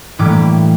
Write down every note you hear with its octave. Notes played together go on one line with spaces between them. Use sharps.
A2 E3 G3 A#3 D6